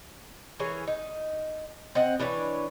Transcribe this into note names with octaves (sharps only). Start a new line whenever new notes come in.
E3 G#4 A#4 C#5
D#4
C4 D#5 F#5
E3 D4 B4 C#5